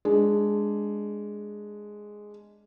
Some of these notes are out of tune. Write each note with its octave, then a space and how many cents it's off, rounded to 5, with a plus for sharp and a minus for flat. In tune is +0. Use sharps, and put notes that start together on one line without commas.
G#3 +0 D4 +0